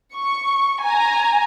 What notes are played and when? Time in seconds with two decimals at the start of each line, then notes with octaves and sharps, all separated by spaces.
0.15 C#6
0.83 G#5 A#5